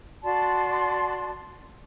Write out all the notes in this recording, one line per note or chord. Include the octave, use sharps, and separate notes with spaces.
F#4 D5 A5 C6